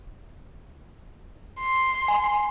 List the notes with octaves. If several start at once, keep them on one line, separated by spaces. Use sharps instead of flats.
C6
G#5